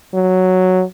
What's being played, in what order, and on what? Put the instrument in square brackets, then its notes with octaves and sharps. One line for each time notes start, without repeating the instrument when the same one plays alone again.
[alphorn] F#3